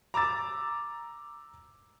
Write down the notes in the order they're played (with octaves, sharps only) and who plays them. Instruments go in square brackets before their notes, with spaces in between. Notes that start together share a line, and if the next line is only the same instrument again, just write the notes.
[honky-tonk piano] A#5 D6 E6 A6